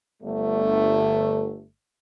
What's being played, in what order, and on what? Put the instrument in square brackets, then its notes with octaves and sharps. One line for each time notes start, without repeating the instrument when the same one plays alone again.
[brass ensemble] G1 A3